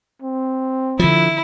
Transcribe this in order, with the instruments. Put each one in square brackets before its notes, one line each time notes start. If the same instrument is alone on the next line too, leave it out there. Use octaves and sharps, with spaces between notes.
[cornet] C4
[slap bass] D3 F3 [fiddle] E4